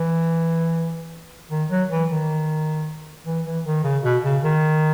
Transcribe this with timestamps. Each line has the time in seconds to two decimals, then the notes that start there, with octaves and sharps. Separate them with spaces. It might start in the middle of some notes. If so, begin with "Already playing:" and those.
Already playing: E3
1.51 D#3
1.70 F#3
1.91 E3
2.10 D#3
3.26 E3
3.46 E3
3.66 D#3
3.84 C#3
4.04 B2
4.23 C#3
4.43 D#3